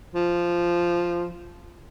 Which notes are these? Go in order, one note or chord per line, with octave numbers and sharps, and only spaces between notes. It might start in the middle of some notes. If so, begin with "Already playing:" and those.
F3